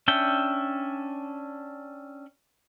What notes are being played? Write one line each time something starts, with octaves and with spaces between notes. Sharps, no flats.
C#4 D4 E5 G5